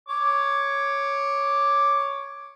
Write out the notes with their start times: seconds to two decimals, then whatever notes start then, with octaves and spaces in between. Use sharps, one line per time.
0.09 C#5 D6